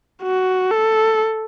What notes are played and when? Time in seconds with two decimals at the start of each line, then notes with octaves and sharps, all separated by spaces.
0.23 F#4
0.71 A4